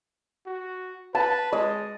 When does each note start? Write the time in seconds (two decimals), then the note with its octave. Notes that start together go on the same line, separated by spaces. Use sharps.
0.46 F#4
1.15 B4 A5
1.53 G#3 D#5